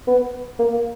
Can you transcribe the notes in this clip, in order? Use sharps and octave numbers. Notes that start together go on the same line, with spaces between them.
B3
A#3